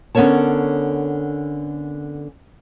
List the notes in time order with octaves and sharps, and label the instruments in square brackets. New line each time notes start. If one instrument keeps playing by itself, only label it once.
[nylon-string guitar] D3 B3 C#4 A#4 C#5 A5